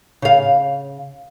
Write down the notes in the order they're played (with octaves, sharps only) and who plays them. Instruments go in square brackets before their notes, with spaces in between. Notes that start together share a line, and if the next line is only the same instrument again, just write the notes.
[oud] C#3 F5